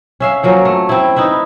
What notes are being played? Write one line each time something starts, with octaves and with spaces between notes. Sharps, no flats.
C#4 E5 F5
F3 F#3 A#3 C#4
A3
C4 E4
D#4 E4 B4 E5